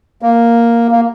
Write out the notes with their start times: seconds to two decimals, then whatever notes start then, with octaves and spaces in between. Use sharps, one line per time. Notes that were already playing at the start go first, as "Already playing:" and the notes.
0.22 A#3
0.91 A#3